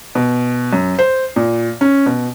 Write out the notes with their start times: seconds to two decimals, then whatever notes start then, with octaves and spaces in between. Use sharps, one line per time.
0.15 B2
0.73 F#2
0.99 C5
1.36 A#2
1.81 C#4
2.06 B2